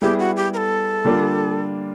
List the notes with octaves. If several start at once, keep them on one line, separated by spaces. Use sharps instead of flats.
G3 B3 E4 G4 G#4
F#4
G4
A#4
A4
D3 G3 A#3 D4 F4